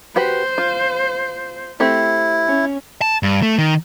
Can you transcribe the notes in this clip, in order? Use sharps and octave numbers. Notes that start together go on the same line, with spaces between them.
F#4 G4 B4 C5
F4
A3 C4 E4 G4
C#4
A5
G2
A3
D#3